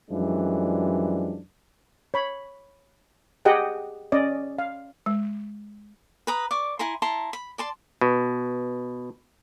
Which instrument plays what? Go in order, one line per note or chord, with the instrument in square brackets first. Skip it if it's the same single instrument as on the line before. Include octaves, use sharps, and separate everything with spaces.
[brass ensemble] F#2 E3 F3 G3 G#3 D4
[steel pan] C#5 B5
G4 G#4 D#5 F#5 G5
C#4 D5 D#5
F5
[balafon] G#3
[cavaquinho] B4 A#5 D#6
D5 C#6 D6
E4 G#5 A#5 C6
E4 A5 A#5 C6
B5
D5 A5 C6
[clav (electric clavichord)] B2